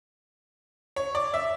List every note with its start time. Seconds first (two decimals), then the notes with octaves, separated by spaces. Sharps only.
0.96 C#5
1.15 D5
1.34 E5